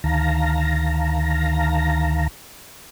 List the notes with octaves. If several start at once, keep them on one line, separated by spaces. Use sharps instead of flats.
D2 D#3 F5 A5 A#5 A#6